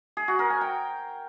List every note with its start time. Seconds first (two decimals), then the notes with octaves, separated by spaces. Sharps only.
0.17 G#4
0.28 F#4
0.39 A#4
0.50 G#5
0.61 G5